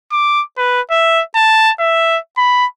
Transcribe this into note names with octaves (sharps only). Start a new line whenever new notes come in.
D6
B4
E5
A5
E5
B5